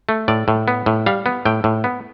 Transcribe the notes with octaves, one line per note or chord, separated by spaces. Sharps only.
A3
A2 D5
A2
B3
A2
G3 F5
B3
A2 G5
A2
B3